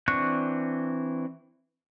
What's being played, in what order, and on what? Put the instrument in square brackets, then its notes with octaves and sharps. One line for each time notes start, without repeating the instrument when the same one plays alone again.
[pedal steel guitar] E3 C4 D4 C#6 F#6